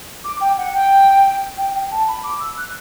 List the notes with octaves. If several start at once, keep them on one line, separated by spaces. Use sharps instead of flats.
D6
G5
F#5
G5
G5
G5
A5
B5
D6
E6
F#6